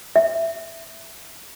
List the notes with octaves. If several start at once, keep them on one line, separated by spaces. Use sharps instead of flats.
E5